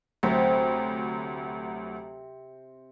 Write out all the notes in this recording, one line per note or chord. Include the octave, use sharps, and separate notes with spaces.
D2 C3 F#3